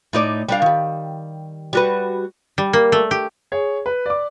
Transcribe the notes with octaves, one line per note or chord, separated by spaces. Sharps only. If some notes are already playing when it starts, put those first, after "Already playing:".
A2 D#4 D5
G3 D4 F5
D#3 G3
G3 F#4 B4
G3
A#3
A3
G4
G#4 C#5
B4
D5 D6